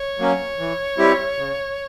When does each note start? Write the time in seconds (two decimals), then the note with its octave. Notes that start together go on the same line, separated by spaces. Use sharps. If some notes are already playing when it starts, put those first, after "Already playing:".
Already playing: C#5
0.19 F#3 A#3 C#4
0.59 E3
0.98 G3 C4 E4 G4
1.38 C#3